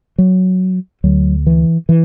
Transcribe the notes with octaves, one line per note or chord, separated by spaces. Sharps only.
F#3
D2 D3 F#3
E3
E3